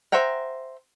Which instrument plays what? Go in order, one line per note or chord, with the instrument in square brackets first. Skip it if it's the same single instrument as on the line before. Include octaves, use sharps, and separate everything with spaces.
[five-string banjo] C5 E5 F#5 G5 A#5